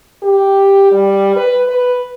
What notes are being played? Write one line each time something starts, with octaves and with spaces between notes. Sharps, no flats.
G4
G3
B4
B4